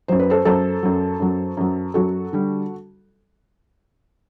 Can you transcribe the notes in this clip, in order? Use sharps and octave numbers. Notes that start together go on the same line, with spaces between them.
F#2 F#3 C5
B4
A4 C5
F#2 F#3 A4 C5
F#2 F#3
F#2 F#3
F#2 F#3
F#2 F#3 F#4 A4
D3 G3